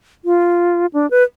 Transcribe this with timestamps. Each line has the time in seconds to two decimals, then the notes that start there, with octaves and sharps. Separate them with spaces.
0.25 F4
0.93 D4
1.11 B4